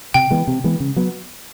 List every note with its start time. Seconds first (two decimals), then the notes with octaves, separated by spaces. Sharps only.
0.14 C3 G5
0.31 E3 G#3 B3
0.47 C3
0.64 E3 G#3 B3
0.80 C#3
0.96 F#3 B3